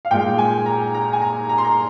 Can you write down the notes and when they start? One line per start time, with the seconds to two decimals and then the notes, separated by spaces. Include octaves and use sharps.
0.05 F5
0.11 A#2 G#3 G5
0.38 G#5
0.66 A#5
0.95 A#5
1.13 G#5
1.21 A#5
1.49 A#5
1.58 C6
1.65 A#5